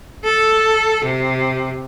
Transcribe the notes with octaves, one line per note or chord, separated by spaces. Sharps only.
A4
C3